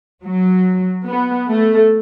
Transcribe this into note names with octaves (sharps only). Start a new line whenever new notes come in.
F#3
B3
A3